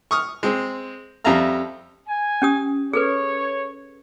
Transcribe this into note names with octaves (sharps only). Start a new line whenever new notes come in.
C#6 D#6 F6
G#3 C4
F2 G3 E5 F5 A#5 F6
G#5
C#4 G4 D#6
G#4 A4 B4 C#5